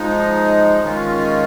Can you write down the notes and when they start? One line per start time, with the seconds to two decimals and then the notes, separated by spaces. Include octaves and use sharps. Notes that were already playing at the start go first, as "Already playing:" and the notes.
Already playing: F3 G#3 D#4
0.81 D#3 G#3 C#4 F4